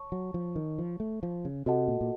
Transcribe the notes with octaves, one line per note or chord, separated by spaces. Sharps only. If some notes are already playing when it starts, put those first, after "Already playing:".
Already playing: C#5 A5 C#6
F#3
F3
D#3
F3
A3
F3
C#3
C3 F#4 A4 D#5 F#5 A5
A#2
A#2